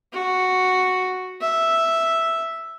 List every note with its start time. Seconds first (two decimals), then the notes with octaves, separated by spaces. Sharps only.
0.13 F#4
1.41 E5